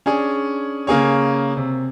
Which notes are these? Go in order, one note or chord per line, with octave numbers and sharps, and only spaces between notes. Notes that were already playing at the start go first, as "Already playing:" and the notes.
C#4 D4 G#4
C#3 A#3 G#4 C#5
C3